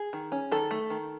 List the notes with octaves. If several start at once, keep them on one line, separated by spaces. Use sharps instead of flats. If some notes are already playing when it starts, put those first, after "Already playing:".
Already playing: G#4
D#3
C#4
D#3 A4
A3
D#3